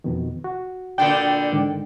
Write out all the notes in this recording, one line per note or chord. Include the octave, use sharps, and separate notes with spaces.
F2 B2 D#3
F#4
A#2 D3 D4 G5
G#2 D3 D#3